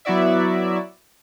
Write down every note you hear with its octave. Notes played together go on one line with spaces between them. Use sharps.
F#3 B3 E4 F#4 D5 E5